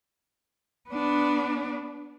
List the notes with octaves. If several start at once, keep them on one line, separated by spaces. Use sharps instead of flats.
B3 D4